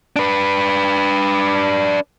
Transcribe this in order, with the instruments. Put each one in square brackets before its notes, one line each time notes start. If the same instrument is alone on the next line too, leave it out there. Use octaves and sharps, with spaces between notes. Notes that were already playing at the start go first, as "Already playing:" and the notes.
[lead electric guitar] D4 B4